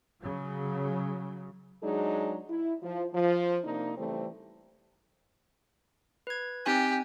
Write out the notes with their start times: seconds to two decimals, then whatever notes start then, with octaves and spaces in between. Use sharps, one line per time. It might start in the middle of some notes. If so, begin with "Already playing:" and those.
0.22 C#3 F#3
1.82 F#3 G#3 D4 D#4 G#4
2.49 E4
2.83 F3
3.14 F3
3.64 C3 A#3 D4 D#4
3.98 C#3 E3 G3 A3 C4
6.27 B4 G#6
6.66 C4 D#4 G4 G#5